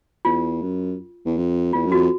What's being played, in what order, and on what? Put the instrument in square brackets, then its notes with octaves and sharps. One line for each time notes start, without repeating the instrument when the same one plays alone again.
[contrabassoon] E2 [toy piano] F4
[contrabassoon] F#2
E2
F2
[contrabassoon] E2 [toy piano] F4
[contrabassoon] F#2
[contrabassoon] F2 [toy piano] F#4